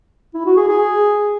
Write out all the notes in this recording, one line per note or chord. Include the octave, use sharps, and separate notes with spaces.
E4
F#4
G#4
G#4